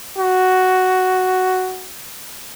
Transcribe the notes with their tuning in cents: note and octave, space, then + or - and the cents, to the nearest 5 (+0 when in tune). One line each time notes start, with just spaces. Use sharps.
F#4 +5